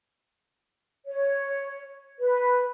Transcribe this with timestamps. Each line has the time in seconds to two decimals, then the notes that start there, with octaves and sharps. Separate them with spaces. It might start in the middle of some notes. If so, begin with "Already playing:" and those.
1.07 C#5
2.19 B4